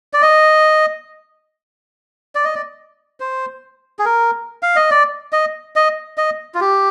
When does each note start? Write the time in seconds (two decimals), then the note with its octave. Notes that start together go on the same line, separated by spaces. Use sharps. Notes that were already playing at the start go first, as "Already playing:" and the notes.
0.13 D5
0.22 D#5
2.35 D5
2.45 D#5
2.55 D5
3.20 C5
3.99 G#4
4.05 A#4
4.63 F5
4.76 D#5
4.91 D5
5.33 D#5
5.76 D#5
6.17 D#5
6.55 F4
6.61 G4